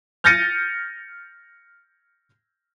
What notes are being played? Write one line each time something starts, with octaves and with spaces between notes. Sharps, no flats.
F6 G6 A6 A#6 C#7 D#7